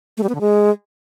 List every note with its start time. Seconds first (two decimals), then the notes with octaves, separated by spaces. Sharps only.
0.17 A3
0.23 G3
0.29 B3
0.35 D3
0.41 G#3